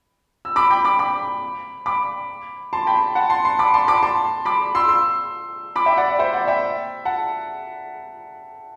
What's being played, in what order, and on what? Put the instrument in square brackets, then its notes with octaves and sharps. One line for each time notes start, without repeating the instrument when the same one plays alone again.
[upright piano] E6
B5 D6
G5 B5
B5 D6
B5 D6
B5 D6
A5 C6
G5 B5
F#5 A5
A5 C6
A5 C6
B5 D6
A5 C6
B5 D6
A5 C6
B5 D6
C6 E6
C6 E6
B5 D6
E5 G5
D5 F#5
D5
C5 E5
D5 F#5
E5 G5
F#5 A5